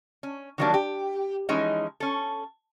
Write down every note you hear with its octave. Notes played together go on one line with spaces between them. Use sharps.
C#4
D#3 E3 F#3 G3 A#3 D4
G4
E3 F3 G#3 C#4 D#4
C#4 A4